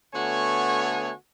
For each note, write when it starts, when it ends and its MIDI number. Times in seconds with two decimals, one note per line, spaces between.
0.15 1.12 50
0.15 1.12 57
0.15 1.12 59
0.15 1.12 66
0.15 1.12 73
0.15 1.12 80